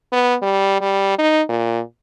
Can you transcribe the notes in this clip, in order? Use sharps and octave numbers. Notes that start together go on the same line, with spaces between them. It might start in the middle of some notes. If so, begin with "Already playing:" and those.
B3
G3
G3
D#4
A#2